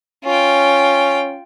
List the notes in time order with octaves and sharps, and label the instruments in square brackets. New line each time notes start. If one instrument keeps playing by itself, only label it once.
[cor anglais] C#4 [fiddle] F4 G5